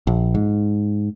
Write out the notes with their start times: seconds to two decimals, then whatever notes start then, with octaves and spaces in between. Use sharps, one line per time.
0.07 A#1
0.35 G#2